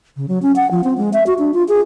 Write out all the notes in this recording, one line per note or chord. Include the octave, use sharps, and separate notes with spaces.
C#3
F#3
C#4
F#5
F3
C4
G#3
E5
F#4
D4
F4
G#4